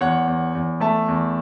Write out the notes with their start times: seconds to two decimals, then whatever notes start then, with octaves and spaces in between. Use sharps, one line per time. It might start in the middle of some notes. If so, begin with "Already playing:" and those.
0.01 E2 C#5 F#5
0.27 E2
0.55 E2
0.80 A3 E5 A5
1.08 E2